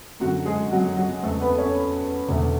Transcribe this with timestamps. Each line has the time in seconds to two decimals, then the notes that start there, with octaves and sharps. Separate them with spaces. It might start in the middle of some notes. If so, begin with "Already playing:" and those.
0.20 F#2 D3 F#3 A3 F#4 F#5
0.45 G#3 G#4
0.71 F#3 F#4
0.97 F#3 F#4
1.23 E2 C#3 G#3 A3 A4
1.40 B3 B4
1.58 C#4 C#5
2.28 E1 E2 D3 A3